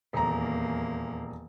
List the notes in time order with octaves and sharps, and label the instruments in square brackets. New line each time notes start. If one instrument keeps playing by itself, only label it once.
[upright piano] D#1 A#5 [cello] E2 A#3